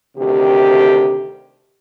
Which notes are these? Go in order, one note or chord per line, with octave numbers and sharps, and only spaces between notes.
D2 C3 D#3 G4